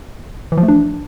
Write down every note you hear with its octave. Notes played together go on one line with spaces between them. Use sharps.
E3
F3
A3
D4